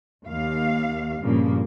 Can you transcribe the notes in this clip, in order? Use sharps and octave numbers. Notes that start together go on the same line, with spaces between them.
D#2 F5
G2 A#2 C#3 F3 A#3